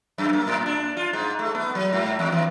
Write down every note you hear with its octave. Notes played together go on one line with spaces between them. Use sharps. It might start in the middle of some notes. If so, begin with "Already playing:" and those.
F#2
A#3
A2
D4
F4
G#2
A3
B3
F#3
G#2
E2
E3